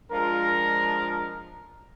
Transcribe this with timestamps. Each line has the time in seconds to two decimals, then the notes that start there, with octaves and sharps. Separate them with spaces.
0.12 F3 G#3 D4 F4 A#4